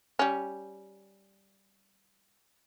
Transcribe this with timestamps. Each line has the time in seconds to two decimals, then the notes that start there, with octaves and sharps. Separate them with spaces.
0.19 G3 C#4